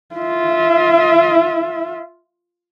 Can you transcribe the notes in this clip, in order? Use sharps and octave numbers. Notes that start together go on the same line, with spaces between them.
F4 E5